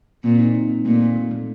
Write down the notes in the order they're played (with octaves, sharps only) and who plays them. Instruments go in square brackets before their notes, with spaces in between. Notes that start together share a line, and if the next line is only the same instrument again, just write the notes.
[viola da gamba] A#2 [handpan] C4
[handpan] D#4
D#4
C4
[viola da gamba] A#2 [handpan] A3
[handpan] A3
A3
A3